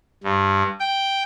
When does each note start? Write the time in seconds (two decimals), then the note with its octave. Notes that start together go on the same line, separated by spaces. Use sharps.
0.24 G2
0.80 G5